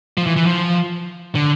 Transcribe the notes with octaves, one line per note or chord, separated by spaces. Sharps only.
F3
E3
E3
F3
D3